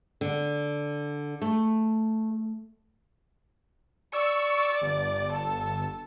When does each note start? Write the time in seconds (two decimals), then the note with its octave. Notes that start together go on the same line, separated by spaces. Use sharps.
0.21 D3
1.42 A3
4.12 D5 C#6 E6 C#7
4.82 G1
5.32 A4